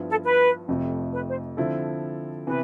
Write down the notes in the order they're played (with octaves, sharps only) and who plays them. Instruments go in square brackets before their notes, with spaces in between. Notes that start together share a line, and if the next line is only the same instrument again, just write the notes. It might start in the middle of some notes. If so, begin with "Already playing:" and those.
Already playing: [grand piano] G2 F3 B3 E4
[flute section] A4
B4
[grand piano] F1 F2 C3 F3 A3
[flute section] B4
C5
[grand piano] D3 F3 C4 E4 A4
[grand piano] C3 E3 B3 [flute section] B4